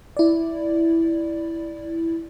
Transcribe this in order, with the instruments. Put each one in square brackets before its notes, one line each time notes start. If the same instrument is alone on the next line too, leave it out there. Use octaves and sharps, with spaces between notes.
[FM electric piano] E4 D5